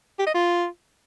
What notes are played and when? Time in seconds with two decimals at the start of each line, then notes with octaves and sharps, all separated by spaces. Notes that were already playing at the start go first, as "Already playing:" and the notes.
0.19 G4
0.27 D#5
0.34 F4